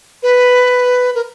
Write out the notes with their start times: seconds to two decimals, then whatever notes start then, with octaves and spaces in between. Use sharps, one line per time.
0.23 B4
1.15 A#4